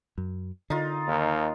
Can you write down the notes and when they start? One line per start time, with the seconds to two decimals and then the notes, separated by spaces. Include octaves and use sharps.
0.18 F#2
0.70 D3 D#4 F4
1.08 D#2